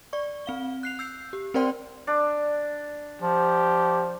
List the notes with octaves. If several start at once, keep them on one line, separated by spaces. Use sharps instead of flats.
D5 C#6
C4 F5 G7
F#6 C7 F7
E6 G6 C7
G4
C4 A#4 C5 D5 G5 C6
D4
F3 G4